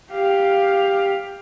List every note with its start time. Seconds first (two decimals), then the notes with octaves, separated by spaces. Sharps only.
0.11 G4 F5